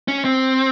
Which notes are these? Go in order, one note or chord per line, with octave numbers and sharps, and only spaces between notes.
C#4
C4